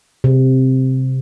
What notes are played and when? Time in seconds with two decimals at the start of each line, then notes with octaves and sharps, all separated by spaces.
0.24 C3